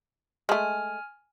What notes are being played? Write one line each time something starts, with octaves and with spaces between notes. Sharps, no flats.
G#3 A3 G#5 F6